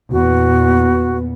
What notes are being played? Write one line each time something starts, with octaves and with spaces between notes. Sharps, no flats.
E2 A#2 B3 F#4